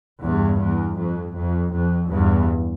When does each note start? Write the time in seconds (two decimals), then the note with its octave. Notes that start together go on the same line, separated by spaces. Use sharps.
0.22 E2 G2
0.60 E2
0.97 F2
1.35 F2
1.73 F2
2.10 E2 G2